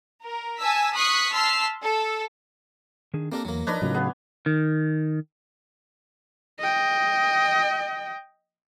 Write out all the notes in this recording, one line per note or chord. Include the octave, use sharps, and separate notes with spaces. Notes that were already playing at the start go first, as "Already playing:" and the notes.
A#4
G#5 A5 E6 B6
C#6 D#6 F#6 B6 C7
A5 C6 E6 F6 B6 C7
A4
D#3 D4 G#4
A#3 C4 D4 G4 A4 A#4
E2 F#3 A#3
F3 D4 D#4 A#4 B4 C#5 A#5
A2 C#3 F#3 F4
B3 G#4 B4 F5
D#3
D#5 G5